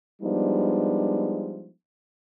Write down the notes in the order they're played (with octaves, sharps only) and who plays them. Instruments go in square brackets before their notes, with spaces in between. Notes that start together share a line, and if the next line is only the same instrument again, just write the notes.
[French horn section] F3 G3 G#3 B3 D4 D#4